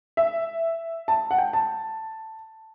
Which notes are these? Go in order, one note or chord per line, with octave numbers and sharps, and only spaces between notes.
E5
A5
F#5
G5
A5